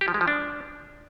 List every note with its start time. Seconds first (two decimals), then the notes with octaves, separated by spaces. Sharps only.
0.01 G4
0.08 F3
0.14 G#3
0.21 F3
0.28 D4